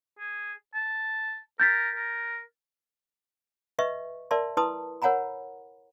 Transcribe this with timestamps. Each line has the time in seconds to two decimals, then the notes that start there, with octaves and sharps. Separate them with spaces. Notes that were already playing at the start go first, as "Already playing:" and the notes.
0.19 G#4
0.74 A5
1.60 A#4 G6 A6 B6
1.95 A#4
3.79 B4 D#5 E5 C#6
4.31 A#4 D5 E5 A5 C6
4.57 E4 B4 A5 C6 D#6
5.02 A#4 C#5 F#5 G#5 A#5 B5